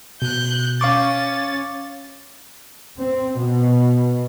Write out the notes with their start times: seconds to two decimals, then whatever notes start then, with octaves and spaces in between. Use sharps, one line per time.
0.22 B2 F#6 G6
0.81 C#4 F5 C#6 D6 A6
2.98 C4
3.38 B2